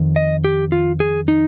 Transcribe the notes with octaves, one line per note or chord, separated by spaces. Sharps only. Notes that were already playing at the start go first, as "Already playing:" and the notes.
Already playing: F2 D#3
D#5
G4
F4
G#4
D#4